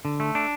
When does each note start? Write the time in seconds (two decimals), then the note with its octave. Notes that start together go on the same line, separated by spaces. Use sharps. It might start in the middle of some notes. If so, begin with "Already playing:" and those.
0.05 D3
0.20 A3
0.35 D4